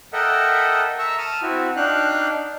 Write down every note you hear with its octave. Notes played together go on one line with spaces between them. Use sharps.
A4 A#4 D#5 E5 F#5 G5
E5 A#5 C#6 E6
A5 D#6 F6
C4 E4 F#4
D4 D#4 F5 G5 F#6